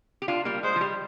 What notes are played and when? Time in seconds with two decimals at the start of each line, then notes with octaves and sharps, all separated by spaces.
0.22 G4
0.28 D4 F4
0.45 G3 A#3
0.63 G#3 C5
0.76 F3
0.81 G3